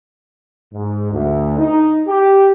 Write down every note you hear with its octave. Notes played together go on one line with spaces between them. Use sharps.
G#2
D2
D#4
G4